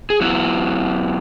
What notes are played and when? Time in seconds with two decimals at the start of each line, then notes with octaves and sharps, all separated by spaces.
0.10 G#4
0.21 F#3 B3 E4 F#4